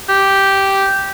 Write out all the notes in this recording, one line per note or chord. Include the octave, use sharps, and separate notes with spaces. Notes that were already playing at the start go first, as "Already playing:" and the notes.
G4